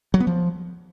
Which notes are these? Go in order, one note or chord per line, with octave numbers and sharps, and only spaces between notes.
F#3
B3
F3